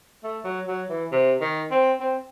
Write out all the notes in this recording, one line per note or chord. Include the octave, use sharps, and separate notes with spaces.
A3
F#3
F#3
E3
C3
D#3
C4
C4